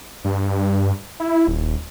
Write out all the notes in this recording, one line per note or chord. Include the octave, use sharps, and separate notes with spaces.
G2
E4
D#1